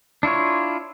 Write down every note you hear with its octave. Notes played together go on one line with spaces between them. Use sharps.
D4 E4 F4 C#5